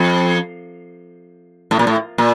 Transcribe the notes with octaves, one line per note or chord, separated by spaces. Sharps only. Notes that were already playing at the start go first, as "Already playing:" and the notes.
Already playing: F2
A2
A#2
A2
A#2